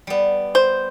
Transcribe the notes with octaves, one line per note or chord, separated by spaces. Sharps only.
G3 B3
C5